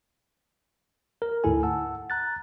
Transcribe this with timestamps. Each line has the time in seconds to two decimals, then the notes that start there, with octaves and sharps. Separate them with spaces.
1.22 A#4
1.44 D2 G#2 E4 A4 G#5
1.63 F#5 A5 E6
2.10 A#5 F#6 A6